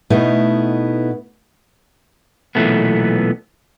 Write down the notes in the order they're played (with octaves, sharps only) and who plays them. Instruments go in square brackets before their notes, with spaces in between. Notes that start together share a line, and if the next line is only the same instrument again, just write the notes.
[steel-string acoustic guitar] B2 A3 B3 D#4 E4
[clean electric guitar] B1 A#2 E3 A3 B3